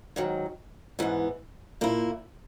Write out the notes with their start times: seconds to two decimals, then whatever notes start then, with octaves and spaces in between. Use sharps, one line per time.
0.16 G#2 D#3 F#3
0.99 G#2 E3 B3
1.81 A#2 A#3 E4